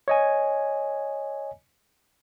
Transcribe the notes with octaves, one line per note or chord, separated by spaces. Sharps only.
C#5 D#5 G#5